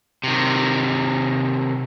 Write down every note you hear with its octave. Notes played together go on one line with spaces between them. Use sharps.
C3 D#3